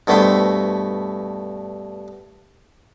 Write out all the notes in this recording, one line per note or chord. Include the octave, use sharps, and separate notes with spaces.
G2 B2 A3 E4 C5